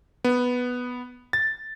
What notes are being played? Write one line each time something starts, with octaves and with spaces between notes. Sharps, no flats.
B3
A6